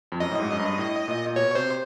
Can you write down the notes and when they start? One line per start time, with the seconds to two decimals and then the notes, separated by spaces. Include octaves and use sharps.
0.12 F2
0.20 F#2 D#5
0.31 A2
0.40 G#2
0.52 F#2
0.59 G2
0.78 A2
1.08 A#2
1.27 A#2
1.36 B2 C#5
1.55 C3 C5